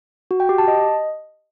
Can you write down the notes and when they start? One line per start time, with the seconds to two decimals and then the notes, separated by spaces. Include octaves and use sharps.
0.31 F#4
0.40 G5
0.49 G4
0.58 A5
0.68 D#5